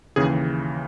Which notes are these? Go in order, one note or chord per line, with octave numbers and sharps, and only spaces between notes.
D#2 C#3 E3 G#4